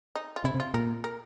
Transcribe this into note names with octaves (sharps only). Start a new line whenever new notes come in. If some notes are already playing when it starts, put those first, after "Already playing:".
D#4
F4
C3 E4
C3
F4
A#2 A#4
A#4